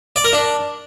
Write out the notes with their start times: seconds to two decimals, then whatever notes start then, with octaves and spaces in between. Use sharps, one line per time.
0.16 D5
0.25 A#4
0.33 D4